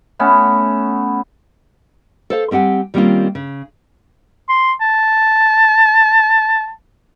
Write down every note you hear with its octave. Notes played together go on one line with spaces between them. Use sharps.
A3 B3 C#4 A4
A4 C5 F5
G3 C4 G4 F#5 G#5
D#3 G3 A#3 C4 C#4 F4
C#3
C6
A5